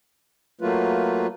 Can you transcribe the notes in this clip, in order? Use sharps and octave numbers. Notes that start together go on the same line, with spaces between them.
F#3 A3 A#3 F4 B4